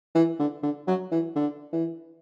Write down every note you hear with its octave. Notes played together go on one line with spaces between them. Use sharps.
E3
D3
D3
F#3
E3
D3
E3